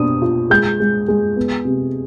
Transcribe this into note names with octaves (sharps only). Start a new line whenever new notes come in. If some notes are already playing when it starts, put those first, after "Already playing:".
Already playing: B2 D4 D#6
F4
G#3 G6
G#3
G#3
B3
C3